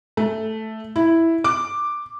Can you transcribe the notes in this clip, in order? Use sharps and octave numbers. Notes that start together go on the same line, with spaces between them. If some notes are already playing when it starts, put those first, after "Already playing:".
A3
E4
D6